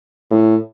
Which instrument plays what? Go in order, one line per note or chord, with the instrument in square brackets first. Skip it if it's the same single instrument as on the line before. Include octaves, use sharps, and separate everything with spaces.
[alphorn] A2